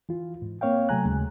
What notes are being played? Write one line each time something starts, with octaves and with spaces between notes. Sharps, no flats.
E3 F4
G#2
A#3 C4 C#5 F5 G5
C3 F#3 A3 G#5 A#5 F#6
D#2 C#3 G#3